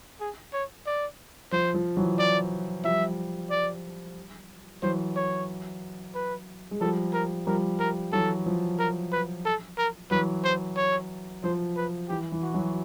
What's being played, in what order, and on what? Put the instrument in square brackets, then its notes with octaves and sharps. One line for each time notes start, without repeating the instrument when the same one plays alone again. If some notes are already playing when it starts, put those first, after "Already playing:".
[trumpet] G#4
C#5
D5
[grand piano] F3 [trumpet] C5
[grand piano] F3
E3 F#3
[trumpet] D5
[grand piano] F3 G3 [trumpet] E5
[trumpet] D5
[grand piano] E3 F#3 [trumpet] C5
[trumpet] C#5
B4
[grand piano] G#3
[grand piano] F3 G3 [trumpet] A4
[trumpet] A#4
[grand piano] F3 G3 [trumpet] A#4
[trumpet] A#4
[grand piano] E3 F#3 [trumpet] A4
[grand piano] F3
[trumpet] A#4
B4
A4
A#4
[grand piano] E3 F#3 [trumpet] B4
[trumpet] C5
C#5
[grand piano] F3 [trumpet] C5
[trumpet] B4
[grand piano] E3 [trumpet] G4
[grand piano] E3
[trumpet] F#4
[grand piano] E3 F#3